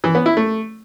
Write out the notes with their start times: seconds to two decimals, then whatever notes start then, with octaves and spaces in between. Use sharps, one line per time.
0.04 E3
0.15 B3
0.26 E4
0.37 A3